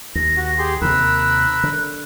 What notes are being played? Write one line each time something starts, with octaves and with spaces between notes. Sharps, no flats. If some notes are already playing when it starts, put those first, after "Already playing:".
D#2 A#6
F#4
G4 G#4 C6
D#2 C3 A#4 B5 E6 F#6
D3